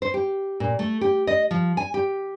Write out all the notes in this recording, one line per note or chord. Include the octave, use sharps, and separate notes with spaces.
C5
G4
A#2
A3
G4
D#5
F3
G#5
G4